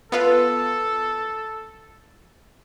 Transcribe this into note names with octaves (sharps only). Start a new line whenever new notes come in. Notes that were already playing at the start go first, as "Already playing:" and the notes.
B3 F4 A4 B4